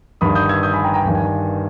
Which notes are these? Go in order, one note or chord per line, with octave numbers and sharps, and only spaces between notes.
G1 G2 D#3 B5 D#6
D#6 G6
E6 G#6
D#6 G6
G#5 B5
G5 A#5
G5 A#5
G1 G2 D#3 G#5
G#5